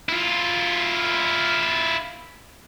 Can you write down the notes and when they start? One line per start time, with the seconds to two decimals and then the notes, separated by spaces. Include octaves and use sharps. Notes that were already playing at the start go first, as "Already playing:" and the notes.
0.09 E4 F4